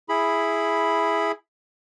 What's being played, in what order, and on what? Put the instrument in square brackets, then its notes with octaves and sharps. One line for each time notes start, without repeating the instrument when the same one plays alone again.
[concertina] E4 G#4 B5